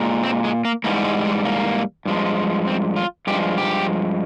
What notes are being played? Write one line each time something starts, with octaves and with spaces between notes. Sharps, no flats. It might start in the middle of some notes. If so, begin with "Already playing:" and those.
Already playing: A#2 G#3
C4
G#3
A#3
G#2 E3 G3 A#3
G#3
G#3
A#3
G2 F3 G#3
C4
F4
G2 F3 G#3 G4
G4